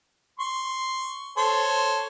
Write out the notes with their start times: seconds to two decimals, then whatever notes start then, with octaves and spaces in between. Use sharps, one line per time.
0.39 C6 C#6
1.37 A4 C5 C#5